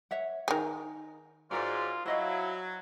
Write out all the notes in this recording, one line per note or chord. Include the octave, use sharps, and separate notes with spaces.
C#5 E5 F#5
D#3 D#4 G#4 A#4
G#2 F4 F#4 A#4 C#5 D5
F#3 E4 C5 D#5 F5